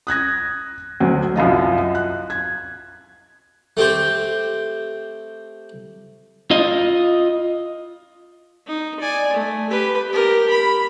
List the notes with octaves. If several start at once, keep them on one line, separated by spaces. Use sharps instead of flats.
D#6 F#6 G#6 A#6
D2 F#3
C2 F#2 F4 D#5
F#6
G#6
A3 C4 G4 C5
F4 D#5
D#4
D5 G#5
A3
G4 B4
G4 A#4
B5